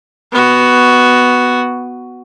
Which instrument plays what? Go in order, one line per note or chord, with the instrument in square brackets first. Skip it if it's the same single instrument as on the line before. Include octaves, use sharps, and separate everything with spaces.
[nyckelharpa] B3 F#4